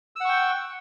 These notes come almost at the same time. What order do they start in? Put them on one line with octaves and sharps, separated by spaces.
E6 F#5 C#6 G5